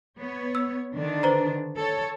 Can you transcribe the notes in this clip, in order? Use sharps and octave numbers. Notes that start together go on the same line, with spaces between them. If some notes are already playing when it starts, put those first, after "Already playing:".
B3 C#5
E6
D3 D#3 D4
B4 C5 A#5
A4 C#5